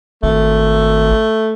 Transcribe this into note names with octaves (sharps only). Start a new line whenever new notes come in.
G#1 A3